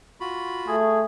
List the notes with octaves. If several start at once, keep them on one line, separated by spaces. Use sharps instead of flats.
F4 F#4 B5
A3 G#4